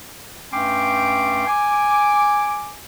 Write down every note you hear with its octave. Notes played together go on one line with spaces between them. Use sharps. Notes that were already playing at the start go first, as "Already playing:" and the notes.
G2 A3 C#4 G5 C6 D6
G#5 D6